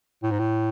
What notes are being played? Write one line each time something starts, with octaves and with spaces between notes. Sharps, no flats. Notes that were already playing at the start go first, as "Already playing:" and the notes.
A2
G#2
A2